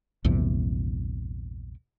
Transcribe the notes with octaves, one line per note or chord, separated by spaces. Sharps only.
A#1 E2 G2 C3